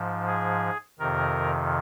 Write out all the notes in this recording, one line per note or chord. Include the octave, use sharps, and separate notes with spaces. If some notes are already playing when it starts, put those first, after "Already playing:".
Already playing: G#2 F3
G#4
F2 C3 D#3 A#4